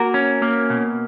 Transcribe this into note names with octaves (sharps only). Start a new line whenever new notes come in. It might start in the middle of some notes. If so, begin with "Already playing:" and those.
Already playing: A#3 F#4 A#4
C#4
A#3
B2